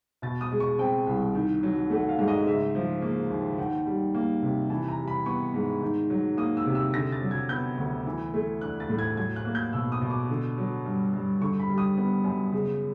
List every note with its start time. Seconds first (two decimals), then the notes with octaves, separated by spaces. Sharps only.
0.22 B2 A6
0.41 D#6
0.51 G#3
0.60 C#6
0.79 C4 G5
1.07 C2
1.35 D#3
1.63 F#3
1.90 A3 F#5
2.09 F5
2.19 G#2
2.28 D#5
2.46 C#3 E5
2.75 F3
3.02 A#3
3.30 D#2
3.58 D#3 F#5
3.86 G3
4.14 A#3
4.43 C3
4.70 E3 A5
4.88 A#5
4.98 G3
5.08 B5
5.26 B3 C#6
5.54 G#2
5.82 D#3
6.10 F#3
6.37 A#3 D#6
6.57 E6
6.66 C3
6.75 E6
6.93 D3 A#6
7.12 A6
7.22 F#3
7.31 G#6
7.49 B3 G6
7.78 D2
8.06 E3
8.34 A3
8.61 D4 F#6
8.80 A6
8.89 A2
8.99 G#6
9.17 F#3 G#6
9.36 F#6
9.45 A#3
9.55 G6
9.73 B2 E6
9.92 D#6
10.01 B2
10.10 D6
10.29 D3
10.58 F#3
10.85 G2
11.13 G2
11.41 D3 C#6
11.60 B5
11.69 G3
11.78 D#6
11.97 B3
12.24 F#2
12.52 C#3